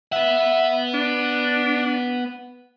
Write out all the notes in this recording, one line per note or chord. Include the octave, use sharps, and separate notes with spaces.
B3 E5 F#5
D4